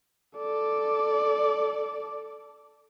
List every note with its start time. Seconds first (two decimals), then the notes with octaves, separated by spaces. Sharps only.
0.38 A4 D5